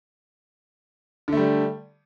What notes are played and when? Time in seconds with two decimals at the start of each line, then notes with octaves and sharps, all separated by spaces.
1.28 D3
1.33 A3
1.37 G3